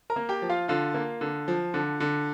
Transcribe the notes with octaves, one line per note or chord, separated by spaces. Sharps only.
A#4 A#5
A#3
G4 G5
F3
F4 F5
D3 F4 F5
A#3
D3
F3
D3
D3